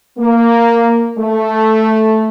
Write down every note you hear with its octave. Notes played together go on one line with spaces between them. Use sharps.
A#3
A3